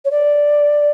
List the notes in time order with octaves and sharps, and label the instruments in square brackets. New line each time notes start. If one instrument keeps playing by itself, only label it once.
[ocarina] C#5
D5